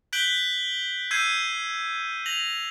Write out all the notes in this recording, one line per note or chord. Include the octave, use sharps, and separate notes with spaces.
F#6 G6 B6 D7 F#7 G7
E6 G6 G#6 C7 D#7
A#6 F7 F#7